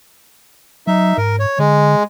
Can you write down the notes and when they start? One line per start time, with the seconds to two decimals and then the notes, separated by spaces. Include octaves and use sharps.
0.87 F#3 D#4 E5
1.18 G#2 A#4
1.39 C#5
1.59 D3 G#3